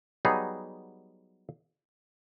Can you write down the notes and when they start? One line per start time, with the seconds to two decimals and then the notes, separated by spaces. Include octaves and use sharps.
0.25 F#3 G3 B3 D#4 G#4